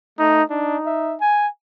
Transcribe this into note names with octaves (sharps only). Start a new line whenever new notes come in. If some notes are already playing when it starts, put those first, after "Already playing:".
A3 D#4
D4 D#4
E5
G#5